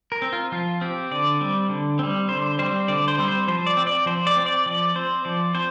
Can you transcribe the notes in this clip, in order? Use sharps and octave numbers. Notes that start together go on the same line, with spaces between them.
A#4
C4
F4
F3 F4
C4 G4
D3 D5
G3 C4
D3
G3 C4
D3 C5
G3 C4 C5
D3 D5
C5
G3 C4
C5
F3 C5
D5
C4
D5
F3 C5
D5
C4
D5
F3 D5
C4 C5
F3 D5
C4 C5